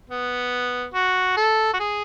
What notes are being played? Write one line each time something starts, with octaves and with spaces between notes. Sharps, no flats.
B3
F#4
A4
F#4
G#4